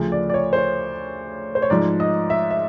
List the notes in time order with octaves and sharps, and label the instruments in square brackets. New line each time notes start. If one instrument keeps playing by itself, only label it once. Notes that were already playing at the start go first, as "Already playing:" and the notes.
Already playing: [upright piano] D2 C#3 F3
D5
D5
C#5
C5
C#5
C5
C#5
G#2 F3 D5
D#5
E5
E5